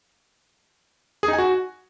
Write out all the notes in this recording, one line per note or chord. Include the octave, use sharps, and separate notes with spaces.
G#4
D#4
G#5
F#4